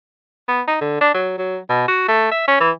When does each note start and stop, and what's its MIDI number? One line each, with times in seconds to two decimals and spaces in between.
0.48 0.62 59
0.68 0.76 63
0.81 0.98 50
1.01 1.14 62
1.14 1.33 54
1.38 1.57 54
1.69 1.87 47
1.88 2.05 66
2.08 2.31 57
2.32 2.44 76
2.48 2.58 61
2.60 2.71 52